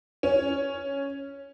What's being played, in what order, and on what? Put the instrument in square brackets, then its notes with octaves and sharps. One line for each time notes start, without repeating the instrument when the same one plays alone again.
[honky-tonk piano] C#4